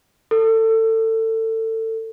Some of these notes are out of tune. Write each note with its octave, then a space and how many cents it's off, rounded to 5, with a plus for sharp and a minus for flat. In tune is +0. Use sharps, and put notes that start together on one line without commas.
A4 +25